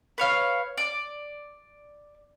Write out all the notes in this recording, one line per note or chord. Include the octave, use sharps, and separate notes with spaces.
B4 C#5 F5
D5